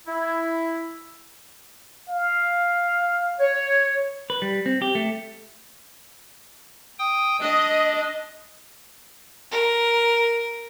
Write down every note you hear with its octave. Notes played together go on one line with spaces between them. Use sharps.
E4
F5
C#5
B4
G3
C4
G4
A3
G5 D#6
D4 D#5
A#4